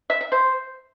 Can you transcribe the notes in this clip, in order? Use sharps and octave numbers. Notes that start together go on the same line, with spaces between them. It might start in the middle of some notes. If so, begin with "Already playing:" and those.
E5
E5
C5